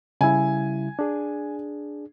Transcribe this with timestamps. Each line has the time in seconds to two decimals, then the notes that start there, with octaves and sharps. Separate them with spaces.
0.21 C#3 G3 E4 G#5
0.99 D4 G#4